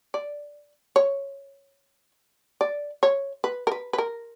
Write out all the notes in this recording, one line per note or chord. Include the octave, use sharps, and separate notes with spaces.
D5
C#5
D5
C#5
B4
A#4
B4
B4
A#4